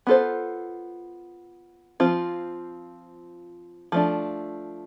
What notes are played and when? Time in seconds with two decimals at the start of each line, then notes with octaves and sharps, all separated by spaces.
0.07 B3 F4 A4 C5
2.00 F3 C4 F4
3.92 F3 A3 D4